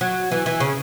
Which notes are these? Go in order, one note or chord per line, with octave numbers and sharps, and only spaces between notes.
F#3
E3
E3
C#3